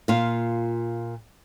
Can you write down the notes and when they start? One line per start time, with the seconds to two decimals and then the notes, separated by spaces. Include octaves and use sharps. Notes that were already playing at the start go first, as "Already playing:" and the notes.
0.08 A#2 F4